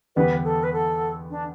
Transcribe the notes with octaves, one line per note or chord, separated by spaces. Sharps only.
E2 D3 G3 B3 B4
A4
B4
A4
D4